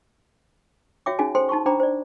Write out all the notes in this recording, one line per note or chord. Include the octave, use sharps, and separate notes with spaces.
F#4 C#5 E5 G5 D6
C#4 D#4 F#4 G#4 G#5
A4 C5 G5 C6
D#4 A5 C6 C#6
D4 C5 G5 A#5 B5 D6
C5 D5